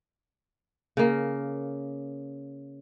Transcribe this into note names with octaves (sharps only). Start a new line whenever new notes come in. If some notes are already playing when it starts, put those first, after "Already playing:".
C#3 A#3